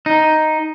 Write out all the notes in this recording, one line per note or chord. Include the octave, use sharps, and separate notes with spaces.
D#4